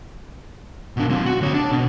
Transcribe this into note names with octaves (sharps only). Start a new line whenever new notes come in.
B2 D4
F#3 C4
F#4
D2 C#5
D4
B2